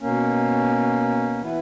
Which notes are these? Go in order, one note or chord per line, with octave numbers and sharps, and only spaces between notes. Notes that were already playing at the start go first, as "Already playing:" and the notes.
B2 A#3 C#4
E3 B3 E4 B4